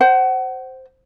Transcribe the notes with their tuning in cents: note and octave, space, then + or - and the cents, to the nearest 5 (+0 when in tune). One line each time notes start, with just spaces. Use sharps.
C5 +0 F#5 +30